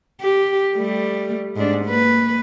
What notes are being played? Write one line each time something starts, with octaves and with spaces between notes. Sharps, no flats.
G4
G3 A3
G#2 D4
A#3 B4